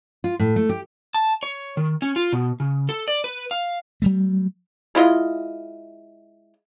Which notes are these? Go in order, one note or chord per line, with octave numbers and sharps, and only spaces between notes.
F4
A2
A3
G4
A5
C#5
D#3
C#4
F4
B2
C#3
A4
D5
B4
F5
F#3 G3 A3
G#3 E4 F4 D#5